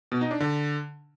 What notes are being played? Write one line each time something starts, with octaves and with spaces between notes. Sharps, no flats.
B2
D#4
D4
D3